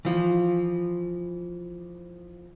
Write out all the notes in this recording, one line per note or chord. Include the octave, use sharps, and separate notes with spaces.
E3 F3